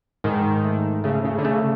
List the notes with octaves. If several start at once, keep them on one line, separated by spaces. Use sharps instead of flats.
G#2 D#3
A3
C#3 A3
C#3
D3
C#3 A3